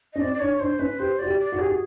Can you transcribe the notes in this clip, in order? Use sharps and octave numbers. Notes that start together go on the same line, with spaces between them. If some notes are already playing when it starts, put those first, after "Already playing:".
C#4 D#5
C4 D5
D5
D4 C#5
D4 C5
C#4 B4
G4 C5
F#4 D5
G4
D5
F#4
G4 G#4
F#4